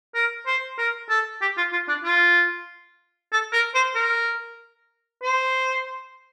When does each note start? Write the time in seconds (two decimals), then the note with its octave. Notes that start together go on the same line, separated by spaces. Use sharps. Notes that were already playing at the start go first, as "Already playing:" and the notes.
0.14 A#4
0.46 C5
0.78 A#4
1.09 A4
1.41 G4
1.57 F4
1.73 F4
1.88 D4
2.04 F4
3.32 A4
3.53 A#4
3.75 C5
3.95 A#4
5.23 C5